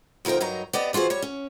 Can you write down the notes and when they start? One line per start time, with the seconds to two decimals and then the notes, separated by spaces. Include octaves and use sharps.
0.25 D2 F3 D#4 A#4 G5
0.40 G2 F#3 D#4 A#4 A#5
0.73 B3 G4 D5 D#5
0.93 E3 F4 F#4 G#4 C5
1.10 G3 C#5
1.22 C#4